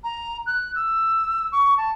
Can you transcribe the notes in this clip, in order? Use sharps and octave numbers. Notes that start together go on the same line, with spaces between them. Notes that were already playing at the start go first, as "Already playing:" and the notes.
A#5
F#6
E6
C#6
A5